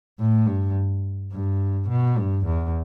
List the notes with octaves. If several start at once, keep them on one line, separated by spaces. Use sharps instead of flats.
A2
G2
G2
B2
G2
E2